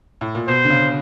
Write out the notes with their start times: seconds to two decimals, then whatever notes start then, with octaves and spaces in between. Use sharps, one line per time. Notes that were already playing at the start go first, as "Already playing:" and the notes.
0.21 A2
0.35 A#2
0.48 B2 C5
0.65 D3
0.70 C#3